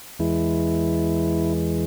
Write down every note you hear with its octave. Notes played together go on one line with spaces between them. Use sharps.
E2 E3 G#3 E4